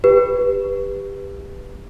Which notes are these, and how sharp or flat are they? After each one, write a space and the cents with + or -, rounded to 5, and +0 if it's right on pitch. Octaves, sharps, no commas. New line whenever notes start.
G4 +20 B4 +0